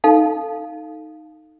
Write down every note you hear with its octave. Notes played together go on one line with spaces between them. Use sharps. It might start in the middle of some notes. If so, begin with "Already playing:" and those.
D#4 A4 F5 A5